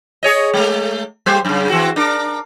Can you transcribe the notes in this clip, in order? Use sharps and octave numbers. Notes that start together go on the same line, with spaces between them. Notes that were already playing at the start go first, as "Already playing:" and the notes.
G#4 C#5 D#5
G#3 A3
G3 G4 C5
F#2 C#3
E3 C4 F#4
D4 A#4